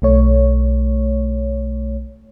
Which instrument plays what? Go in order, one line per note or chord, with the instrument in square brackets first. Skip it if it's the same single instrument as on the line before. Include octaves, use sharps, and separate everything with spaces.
[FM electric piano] B1 A3 C#5